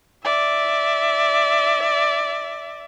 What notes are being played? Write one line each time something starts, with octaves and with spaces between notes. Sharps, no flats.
D5 E5